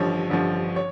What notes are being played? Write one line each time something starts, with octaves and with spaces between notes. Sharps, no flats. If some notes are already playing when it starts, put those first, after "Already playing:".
Already playing: A1 G2 D3 F3 C#5
A1 G2 D3 F3
C#5